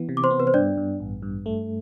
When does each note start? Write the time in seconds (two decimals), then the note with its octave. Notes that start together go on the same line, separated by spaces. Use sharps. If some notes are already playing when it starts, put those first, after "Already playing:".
Already playing: E3 B3
0.09 C3
0.17 D6
0.24 C5 C6
0.31 B3
0.40 B4
0.47 C5
0.54 G2 D4 D5
0.77 G2
1.00 A1
1.22 G2
1.46 A3